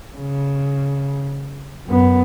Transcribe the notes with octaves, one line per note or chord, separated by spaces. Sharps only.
C#3
F#2 B3